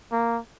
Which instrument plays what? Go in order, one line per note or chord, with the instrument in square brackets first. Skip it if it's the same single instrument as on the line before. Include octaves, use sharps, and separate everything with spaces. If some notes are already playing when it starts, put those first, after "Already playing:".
[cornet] A#3